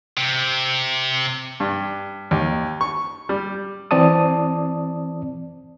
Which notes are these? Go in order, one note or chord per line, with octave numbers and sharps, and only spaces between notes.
C3
G2
D#2
C#6
G3
E3 C4 D5 A5 D#6